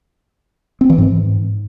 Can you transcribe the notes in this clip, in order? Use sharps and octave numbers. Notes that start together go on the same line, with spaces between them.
C4
E3
G#2